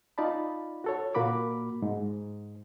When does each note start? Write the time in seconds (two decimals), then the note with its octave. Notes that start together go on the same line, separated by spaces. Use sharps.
0.18 D#4 F4 D5 A5 B5
0.84 F#4 A4 C#5
1.15 A#2 A#3 F#4 B5 D6
1.82 G#2